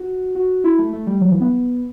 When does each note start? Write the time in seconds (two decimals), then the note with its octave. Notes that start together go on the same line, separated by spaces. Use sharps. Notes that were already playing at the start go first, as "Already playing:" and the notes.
Already playing: F#4
0.35 F#4
0.64 E4
0.79 A3
0.93 A3
1.07 G3
1.21 F#3
1.31 E3
1.41 B3